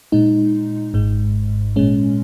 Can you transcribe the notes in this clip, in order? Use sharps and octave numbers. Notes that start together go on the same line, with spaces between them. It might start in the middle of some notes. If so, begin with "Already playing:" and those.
A#2 G#3 D#4
G#1 G#2 G#3
A#2 G#3 C#4